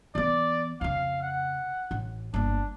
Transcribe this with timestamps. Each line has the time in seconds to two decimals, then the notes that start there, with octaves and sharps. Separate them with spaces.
0.15 E3 B3 D5
0.81 F2 C#3 F5
1.22 F#5
1.91 A1
2.34 G1 A#3 D4